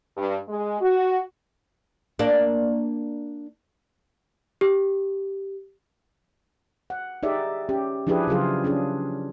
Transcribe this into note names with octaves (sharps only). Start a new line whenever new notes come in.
G2
G#3
F#4
A#3 D4
G4
F#5
D#4 G4 G#4 D5 E5
C#4 G4
F3 D4 E4 G4 G#4 B4
C#3 F#3 F4 G#4
C#4 D4 G#4